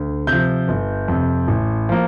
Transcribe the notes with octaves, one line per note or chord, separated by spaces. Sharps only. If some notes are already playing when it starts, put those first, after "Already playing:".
Already playing: D2
C3 G6
F3
G1
F2 C3
A1
F3 A#3